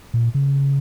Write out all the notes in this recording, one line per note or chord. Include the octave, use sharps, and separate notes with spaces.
A#2
C#3